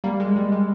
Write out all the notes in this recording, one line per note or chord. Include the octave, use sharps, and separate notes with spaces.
G3 A#3
G#3
G3
G#3